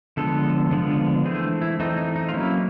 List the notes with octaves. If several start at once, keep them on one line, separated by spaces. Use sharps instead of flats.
D3 F3 G#3 B3 A4
D3 F3 G#3 B3
E3 A3 C4 G#4
E4
E3 A3 C4 D#4
D#4
D#4
F4
F#3 A#3 C#4 E4